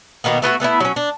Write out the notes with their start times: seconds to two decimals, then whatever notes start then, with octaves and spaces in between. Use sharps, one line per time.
0.24 B2 D#3 A#3 B3
0.42 A3 B3 F4 F#4
0.60 A3 B3 C#4 E4
0.80 F#3 C#4
0.96 D4